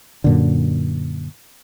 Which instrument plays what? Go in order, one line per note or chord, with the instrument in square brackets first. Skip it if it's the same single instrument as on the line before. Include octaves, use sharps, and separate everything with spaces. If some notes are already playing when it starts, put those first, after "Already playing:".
[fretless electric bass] F#2 A#2 D3